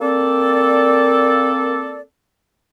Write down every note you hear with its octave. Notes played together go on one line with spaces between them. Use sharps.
A#3 C4 A4 D5